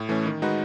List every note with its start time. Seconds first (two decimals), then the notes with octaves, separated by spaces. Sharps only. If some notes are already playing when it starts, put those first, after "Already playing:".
Already playing: A2
0.09 E3 A3 C#4
0.26 D#3
0.42 G#3 D#4 F#4 B4